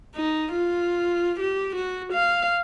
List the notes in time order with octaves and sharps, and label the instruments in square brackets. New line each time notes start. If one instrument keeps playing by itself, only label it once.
[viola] D#4
F4
G4
F#4
F5